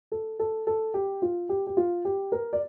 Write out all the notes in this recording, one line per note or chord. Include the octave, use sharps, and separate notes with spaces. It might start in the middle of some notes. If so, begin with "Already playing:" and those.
A4
A4
A4
G4
F4
G4
G4
F4
G4
A#4
D5